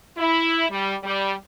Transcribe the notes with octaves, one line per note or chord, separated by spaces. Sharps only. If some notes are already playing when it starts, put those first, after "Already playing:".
E4
G3
G3